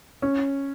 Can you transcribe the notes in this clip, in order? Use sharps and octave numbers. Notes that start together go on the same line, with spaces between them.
C#4